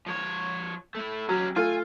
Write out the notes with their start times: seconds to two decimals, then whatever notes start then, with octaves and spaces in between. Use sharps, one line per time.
0.06 F3 C#5
0.95 A3 E4
1.29 F#3 C#4 G4
1.56 A3 F4 G#5